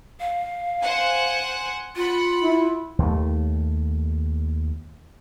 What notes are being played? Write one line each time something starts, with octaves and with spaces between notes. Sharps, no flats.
F5
C5 F#5 G#5
F4 F#5 B5
E4
D#2 A3